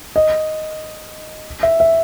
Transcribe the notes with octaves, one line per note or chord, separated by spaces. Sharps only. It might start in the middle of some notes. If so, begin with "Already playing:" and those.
D#5
E5
E5